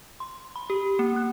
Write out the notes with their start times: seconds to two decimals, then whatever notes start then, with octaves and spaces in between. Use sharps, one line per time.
0.20 C6
0.56 B5
0.70 G4
0.99 A#3
1.16 F#6